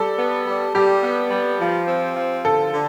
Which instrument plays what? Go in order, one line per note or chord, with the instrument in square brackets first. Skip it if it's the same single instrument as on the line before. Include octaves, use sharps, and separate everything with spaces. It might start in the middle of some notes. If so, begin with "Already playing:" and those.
Already playing: [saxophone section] G3 [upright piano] A4
[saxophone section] B3
G3
[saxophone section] G3 [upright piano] G4
[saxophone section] B3
G3
F3
C4
F3
[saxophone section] D3 [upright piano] A4
[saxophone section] D3